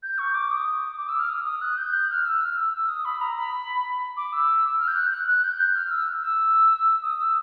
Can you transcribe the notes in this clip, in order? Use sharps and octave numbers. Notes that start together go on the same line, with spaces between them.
G6
C#6
D6
D#6
D6
E6
F6
D#6
D#6
F#6
G6
F#6
F6
E6
F6
E6
E6
D#6
B5
A#5
B5
D6
E6
F6
G6
F#6
F#6
F#6
G6
F#6
F6
E6
E6
D#6
E6